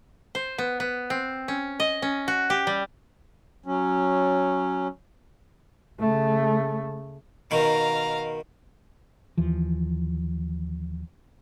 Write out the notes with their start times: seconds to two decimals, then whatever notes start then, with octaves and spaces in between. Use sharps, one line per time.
0.35 C5
0.58 B3
0.80 B3
1.10 C4
1.48 C#4
1.80 D#5
2.02 C#4
2.28 F#4
2.50 G4
2.67 G3
3.66 F#3 C#4
6.00 C#3 A3
7.51 B2 D#3 F5 A#5
9.38 D#2 E3 F3